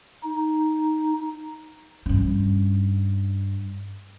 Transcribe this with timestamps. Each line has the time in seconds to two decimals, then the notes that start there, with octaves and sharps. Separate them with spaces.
0.24 D#4
2.06 G2 C#4